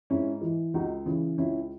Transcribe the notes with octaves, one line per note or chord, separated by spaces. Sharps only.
G#2 C#4 E4
E3
C#2 D#4 F#4
C#3 E3
C#2 C#4 E4